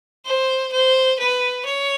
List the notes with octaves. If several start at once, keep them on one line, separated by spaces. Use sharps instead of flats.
C5
C5
B4
C#5